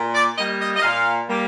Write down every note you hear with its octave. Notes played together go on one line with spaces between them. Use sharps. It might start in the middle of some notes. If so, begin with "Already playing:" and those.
Already playing: A#2
D5
G3 A#3 D#5
D#5
D#5
A#2 F5
G3 A#3